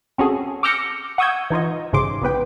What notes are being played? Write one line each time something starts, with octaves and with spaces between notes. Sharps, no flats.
C4 C#4 F#4 G#4 A4
D6 E6 F6 G6 A#6 C#7
F#5 C#6 D#6 E6 G6 G#6
E3 D#4 F4 D#5
A1 G#2 C#3 C6 D6
A#1 G#2 B3 B4 G5